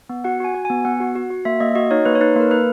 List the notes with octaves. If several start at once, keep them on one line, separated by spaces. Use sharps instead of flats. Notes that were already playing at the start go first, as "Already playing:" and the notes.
B3
F#4 F#5
F#4 G#5
F#4
B3 G#5
B3 F#5
F#4
F#4
F#4
A#3 E5
A#3 D#5
F#4 D#5
D#4 C#5
A#3 B4
C#5
D#4 B4
A#3 A#4
A#3 B4